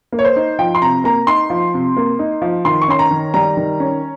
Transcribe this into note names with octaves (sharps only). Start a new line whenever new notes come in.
A#3
C#5
C5
D#4
F3 G5
C6
C3 A#5
A#3 A#5
D#4 C6
F3
C3
A#3
D#4
F3
D#3 C6
C#6
C#4 C6
A#5
D#3
G3 A#5
D#3
C#4